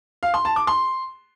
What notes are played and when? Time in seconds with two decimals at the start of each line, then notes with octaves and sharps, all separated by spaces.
0.23 F5
0.34 C6
0.45 A5
0.56 D6
0.67 C6